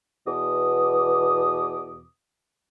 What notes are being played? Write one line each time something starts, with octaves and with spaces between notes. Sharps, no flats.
E2 B2 D6 D#6